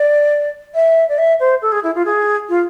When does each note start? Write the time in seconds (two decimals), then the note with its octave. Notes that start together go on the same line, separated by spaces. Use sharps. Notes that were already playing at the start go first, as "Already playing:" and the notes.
Already playing: D5
0.74 E5
1.09 D5
1.18 E5
1.40 C5
1.62 A4
1.72 G#4
1.83 E4
1.95 F4
2.05 G#4
2.49 F4